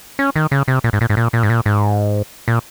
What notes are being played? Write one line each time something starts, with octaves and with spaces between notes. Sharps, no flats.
C#4
D#3
C#3
C3
A#2
G#2
A#2
G#2
A#2
A#2
G#2
A#2
G#2
A#2